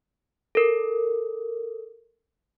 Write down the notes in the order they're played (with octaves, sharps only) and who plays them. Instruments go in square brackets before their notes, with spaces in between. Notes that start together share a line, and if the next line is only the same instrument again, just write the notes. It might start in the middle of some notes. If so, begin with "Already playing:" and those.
[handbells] A4 A#4